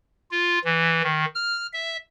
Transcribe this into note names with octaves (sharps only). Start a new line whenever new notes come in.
F4
E3
D#3
F6
E5